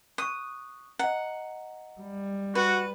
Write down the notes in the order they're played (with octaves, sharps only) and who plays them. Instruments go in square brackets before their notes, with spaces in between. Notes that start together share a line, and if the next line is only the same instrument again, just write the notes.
[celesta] C#6 F#6 [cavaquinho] D#6
[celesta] D#5 A#5 [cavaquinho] F#5
[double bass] G3
[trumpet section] F#4 [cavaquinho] B4